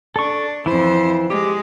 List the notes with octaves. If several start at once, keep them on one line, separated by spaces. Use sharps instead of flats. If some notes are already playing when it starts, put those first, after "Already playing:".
D4 A4 C#6
F2 E3 E4 C5
G#3 G4